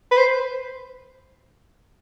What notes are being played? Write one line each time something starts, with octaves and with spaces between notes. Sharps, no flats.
B4
C5